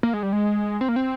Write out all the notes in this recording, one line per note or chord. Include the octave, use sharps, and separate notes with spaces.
A#3
G#3
G3
G#3
C4
A#3
C4